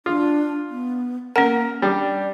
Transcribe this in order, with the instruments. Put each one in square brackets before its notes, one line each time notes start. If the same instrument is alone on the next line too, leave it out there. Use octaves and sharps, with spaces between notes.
[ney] D4 [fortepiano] F4
[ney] B3
[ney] A#3 [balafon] C#4 F#5 [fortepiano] A#4
[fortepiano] G3 D4 [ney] D5